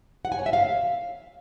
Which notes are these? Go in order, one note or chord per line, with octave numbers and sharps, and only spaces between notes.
F#5
G#5
C#5
E5
F5